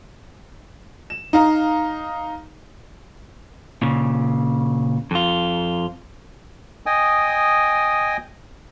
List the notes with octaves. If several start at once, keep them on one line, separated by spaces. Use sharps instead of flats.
E7
D#4 F5 A#5
A#2 C#3
F2 F4
D#5 G5 G#5 D#6